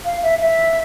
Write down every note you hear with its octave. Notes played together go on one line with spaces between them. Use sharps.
F5
E5
E5